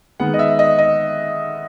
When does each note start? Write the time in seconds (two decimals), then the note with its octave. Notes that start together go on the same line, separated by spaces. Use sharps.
0.20 D#3 G#3 B3 F#5
0.34 D#5
0.39 E5
0.59 D#5
0.79 D#5